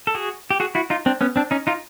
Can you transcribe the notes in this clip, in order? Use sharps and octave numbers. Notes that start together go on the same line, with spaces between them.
A4
F#4 G#4
G4
F#4 G#4
E4 F#4
D#4 F4
C4 D4
B3 C#4
C4 D4
C#4 D#4
D#4 F4